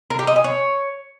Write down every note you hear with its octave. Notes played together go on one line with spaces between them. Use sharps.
A#4
G4
D#5
G#5
C#5